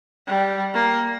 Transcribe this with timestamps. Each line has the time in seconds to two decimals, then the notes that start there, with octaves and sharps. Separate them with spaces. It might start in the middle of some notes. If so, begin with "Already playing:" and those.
0.27 G3
0.74 A#3